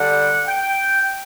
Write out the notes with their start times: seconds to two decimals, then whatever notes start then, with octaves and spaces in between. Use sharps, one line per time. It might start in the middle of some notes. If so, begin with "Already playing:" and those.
Already playing: D3 G3 F#5
0.47 G5